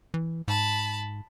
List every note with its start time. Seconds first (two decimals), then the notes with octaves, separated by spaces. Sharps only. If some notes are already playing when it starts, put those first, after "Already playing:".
0.14 E3
0.48 G#2 A5 B5